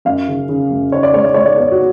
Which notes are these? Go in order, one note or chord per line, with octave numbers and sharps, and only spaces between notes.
F#2 F5
C#3
C#3
F#2
C#3 C#5
D5
G#3 C#5
D5
G#3 C#5
D5
B3 C#5
F#4